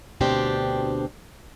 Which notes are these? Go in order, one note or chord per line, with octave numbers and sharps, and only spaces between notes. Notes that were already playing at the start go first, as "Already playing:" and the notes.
D2 B2 C4 D4 G4